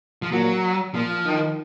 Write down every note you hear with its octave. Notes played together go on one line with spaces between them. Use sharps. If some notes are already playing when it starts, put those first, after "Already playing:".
F3
A#2 F#3
A#2 F3
D#3